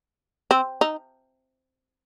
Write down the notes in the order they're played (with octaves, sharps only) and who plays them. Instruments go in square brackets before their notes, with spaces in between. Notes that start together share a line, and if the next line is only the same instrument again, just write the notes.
[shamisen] C4
D#4